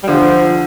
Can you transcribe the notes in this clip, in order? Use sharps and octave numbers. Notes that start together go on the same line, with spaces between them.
G3
D3 F3